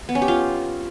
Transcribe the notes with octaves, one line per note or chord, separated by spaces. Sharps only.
B3
C#4
G4
F4